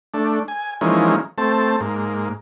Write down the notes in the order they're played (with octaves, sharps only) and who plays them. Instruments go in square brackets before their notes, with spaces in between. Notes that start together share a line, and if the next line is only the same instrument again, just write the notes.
[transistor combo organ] A3 D4
G#5
E3 F3 G#3 A#3 C#4 D#4
A3 C4 A5
G#2 A#3